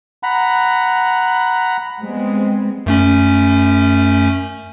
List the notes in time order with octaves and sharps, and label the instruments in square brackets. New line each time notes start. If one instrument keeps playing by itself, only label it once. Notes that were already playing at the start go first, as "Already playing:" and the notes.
[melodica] F#5 A#5 B5
[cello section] G3 G#3 B3 C4
[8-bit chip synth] F#2 A3 C#4